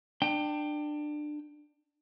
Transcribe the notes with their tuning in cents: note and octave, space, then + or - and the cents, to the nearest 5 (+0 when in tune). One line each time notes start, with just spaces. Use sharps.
D4 +25 G5 +0